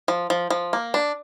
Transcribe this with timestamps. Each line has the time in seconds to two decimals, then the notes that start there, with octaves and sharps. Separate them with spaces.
0.08 F3
0.30 F3
0.50 F3
0.73 A#3
0.94 D4